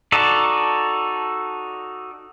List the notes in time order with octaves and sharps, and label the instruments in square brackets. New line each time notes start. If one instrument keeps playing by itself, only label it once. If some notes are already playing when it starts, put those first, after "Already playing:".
[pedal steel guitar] D#4 F#4 A4 D5